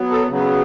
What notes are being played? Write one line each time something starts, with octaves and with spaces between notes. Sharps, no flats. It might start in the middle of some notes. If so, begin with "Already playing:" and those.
Already playing: F#3 B3
A4
C#3 F#3 B3